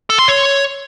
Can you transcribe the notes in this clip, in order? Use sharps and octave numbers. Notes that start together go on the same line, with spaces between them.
A4
C6
C#5